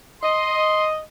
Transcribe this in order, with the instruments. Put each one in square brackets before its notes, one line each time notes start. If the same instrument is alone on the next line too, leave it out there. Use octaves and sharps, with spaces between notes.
[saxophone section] D#5 [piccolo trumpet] C6